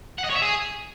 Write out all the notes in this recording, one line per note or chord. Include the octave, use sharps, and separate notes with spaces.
F#5
D#5
C#5
E5
G#4